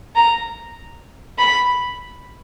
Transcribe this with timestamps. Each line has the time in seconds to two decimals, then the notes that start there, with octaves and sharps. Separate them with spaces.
0.15 A#5
1.38 B5